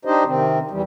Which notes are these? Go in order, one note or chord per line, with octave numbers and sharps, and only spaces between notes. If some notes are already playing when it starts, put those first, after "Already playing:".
D4 D#4 G4 C5 D#5
C3 D#3 C4
E2 E3 G3